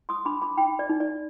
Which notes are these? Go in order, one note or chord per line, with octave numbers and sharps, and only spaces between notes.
C6 D#6
D4 B5 D6
B5 D6
D#4 G5 B5
D5
D#4
D5